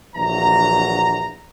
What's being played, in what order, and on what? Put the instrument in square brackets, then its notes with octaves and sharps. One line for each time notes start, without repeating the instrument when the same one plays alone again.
[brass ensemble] A#1 D3 E3 F#3 A#5